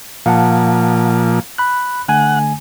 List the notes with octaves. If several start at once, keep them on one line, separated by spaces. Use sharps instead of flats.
A#2 F3 F5 F#5 A5
B5 F#6
D3 A3 F#5 G#5